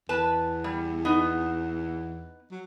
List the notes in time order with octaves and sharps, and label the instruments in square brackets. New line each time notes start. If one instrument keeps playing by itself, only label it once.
[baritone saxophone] E2 [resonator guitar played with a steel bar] B4 A5
[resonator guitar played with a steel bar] G3
B3 D#4
[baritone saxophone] F#3